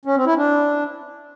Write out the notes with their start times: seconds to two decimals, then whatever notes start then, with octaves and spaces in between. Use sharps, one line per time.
0.05 C#4
0.16 C4
0.26 E4
0.37 D4